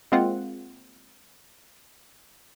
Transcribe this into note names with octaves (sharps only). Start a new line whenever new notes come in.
G#3 A#3 C4 F4 F#5